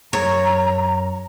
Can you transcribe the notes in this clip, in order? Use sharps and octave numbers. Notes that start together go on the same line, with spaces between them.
F#2 C#5 A#5